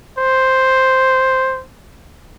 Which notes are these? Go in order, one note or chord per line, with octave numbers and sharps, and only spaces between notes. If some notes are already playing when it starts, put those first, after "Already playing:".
C5